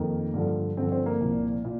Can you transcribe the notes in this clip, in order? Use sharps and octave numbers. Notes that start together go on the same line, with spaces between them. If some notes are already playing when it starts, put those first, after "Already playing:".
Already playing: F2 D#3 A#3 A#4
G2 D3 F3
G2 D3 F3 C4 C5
C4 C5
A#3 A#4
C2 A#2 F3
A#2